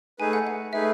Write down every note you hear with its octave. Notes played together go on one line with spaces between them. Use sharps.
A3 D#4 G#4 B4 G#5
F#5
F#5
A3 D#4 G#4 B4 E5